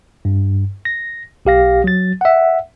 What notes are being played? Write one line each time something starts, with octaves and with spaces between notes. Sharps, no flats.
G2
A#6
B1 G4 F5 A#6
F#3 A6
E5 F#5